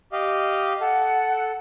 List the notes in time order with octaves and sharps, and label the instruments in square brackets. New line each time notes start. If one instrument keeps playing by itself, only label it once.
[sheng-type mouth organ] G4 D#5 F5
[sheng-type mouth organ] A4 [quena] F#5